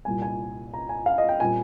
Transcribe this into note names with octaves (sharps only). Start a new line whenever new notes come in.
C2 A#2 G3 G#5
G#5
A#5
G#5
F5
D#5
G5
A#2 G3 C4 G#5